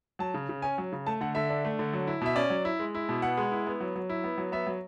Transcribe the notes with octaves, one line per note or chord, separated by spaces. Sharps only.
F#3 A5
C#3
C#3
C#4 G#5
F#3
C#3
A3 A5
D3 F#5
D3 E5
D4
A3
D3
F#3
E4
B2 E5
C#4 D5
F#3
E4
G#3
E4
B2
B3 F#5
G#3
E4
B3
F#3
F#3
E4
B3
F#3
B3 E5
F#3